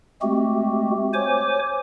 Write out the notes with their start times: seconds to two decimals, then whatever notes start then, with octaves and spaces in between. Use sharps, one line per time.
0.22 G#3 A3 C4 F#4 G4
1.14 C5 C#5 G#5 D6